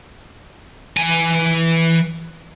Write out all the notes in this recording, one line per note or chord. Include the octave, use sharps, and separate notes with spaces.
E3 G#5